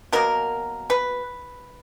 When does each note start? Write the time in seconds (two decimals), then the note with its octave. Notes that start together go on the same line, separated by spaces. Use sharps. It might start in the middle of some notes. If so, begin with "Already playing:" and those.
0.12 B2 F#3 A#3 A#4
0.90 B4